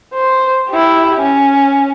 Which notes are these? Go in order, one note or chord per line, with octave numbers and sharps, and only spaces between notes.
C5
E4 G4
C#4